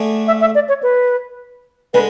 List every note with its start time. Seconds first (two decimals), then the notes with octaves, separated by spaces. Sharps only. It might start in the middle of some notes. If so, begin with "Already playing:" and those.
Already playing: D3 A3 D4 G#4
0.27 E5
0.41 E5
0.55 D5
0.69 C#5
0.83 B4
1.94 D3 G#3 B4